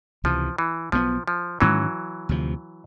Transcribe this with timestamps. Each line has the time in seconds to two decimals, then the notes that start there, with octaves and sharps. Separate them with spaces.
0.24 C#2 C3 E3 F3
0.58 E3
0.92 B1 B2 F3 G3 B3
1.27 F3
1.60 G#2 D#3 E3 F#3 G#3 C#4
2.29 D2 C3 F3